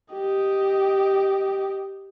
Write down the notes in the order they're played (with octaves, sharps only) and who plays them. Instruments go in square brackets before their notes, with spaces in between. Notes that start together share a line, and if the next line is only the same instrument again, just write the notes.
[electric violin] G4 D#5